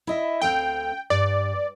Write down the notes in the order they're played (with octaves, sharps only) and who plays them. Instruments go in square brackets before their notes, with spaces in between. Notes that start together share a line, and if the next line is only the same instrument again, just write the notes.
[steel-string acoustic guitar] E4 D#5 E5
[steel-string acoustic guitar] D2 C4 F5 [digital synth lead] G5
[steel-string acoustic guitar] G2 [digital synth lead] D5